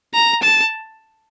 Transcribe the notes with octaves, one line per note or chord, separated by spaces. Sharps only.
A#5
A5